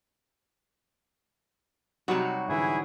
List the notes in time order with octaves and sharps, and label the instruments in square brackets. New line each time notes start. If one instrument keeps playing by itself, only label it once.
[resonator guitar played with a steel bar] C3 F#4 [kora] F#3 G3 D#4
[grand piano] G#2 D3 E3 [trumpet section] E4 G#4